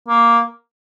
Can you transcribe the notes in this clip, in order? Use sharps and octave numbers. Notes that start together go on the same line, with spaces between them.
A#3